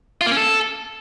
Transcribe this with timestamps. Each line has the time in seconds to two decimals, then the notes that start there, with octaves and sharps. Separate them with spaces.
0.21 F4
0.26 A#3
0.31 C#4
0.36 A4